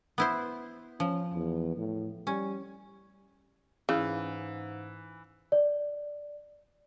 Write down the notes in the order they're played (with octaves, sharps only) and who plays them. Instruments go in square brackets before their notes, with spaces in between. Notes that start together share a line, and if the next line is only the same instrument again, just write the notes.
[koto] B3 E4 C5
[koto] F3 [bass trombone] C#4
[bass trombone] E2
A2
[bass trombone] G3 [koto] C#4
[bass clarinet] G#2 [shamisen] C#3 [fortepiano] E3
[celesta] D5